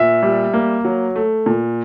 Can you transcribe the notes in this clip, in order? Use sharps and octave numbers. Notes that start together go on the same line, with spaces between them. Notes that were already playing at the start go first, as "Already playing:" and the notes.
Already playing: A#2 E5
G3
A#3
F#3
A3
A#2